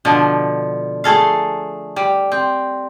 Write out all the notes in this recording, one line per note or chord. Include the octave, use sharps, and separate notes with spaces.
B2 D3 F3
A3 G#4 A4 F5
G3
C4